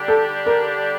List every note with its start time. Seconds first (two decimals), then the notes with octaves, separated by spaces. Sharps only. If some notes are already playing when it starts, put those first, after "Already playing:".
Already playing: D3 G3 D4 G4
0.08 A4
0.46 A#4